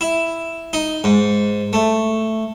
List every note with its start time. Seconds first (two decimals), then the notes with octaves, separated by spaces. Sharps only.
0.01 E4
0.73 D#4
1.04 G#2
1.73 A3